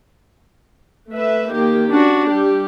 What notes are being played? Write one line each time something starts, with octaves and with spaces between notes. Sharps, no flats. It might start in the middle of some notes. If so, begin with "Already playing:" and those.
A3 B4 E5
D#3 A#3 G4
C#4 D4 F#4
G3 G4